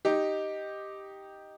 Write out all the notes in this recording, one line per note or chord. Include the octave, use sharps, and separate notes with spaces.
D#4 G4